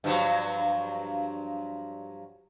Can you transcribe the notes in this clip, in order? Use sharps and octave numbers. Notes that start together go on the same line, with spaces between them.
G2 F3 F#3